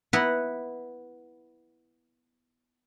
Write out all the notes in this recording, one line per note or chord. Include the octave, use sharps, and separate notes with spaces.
B3 E4 B4 F#5 A#5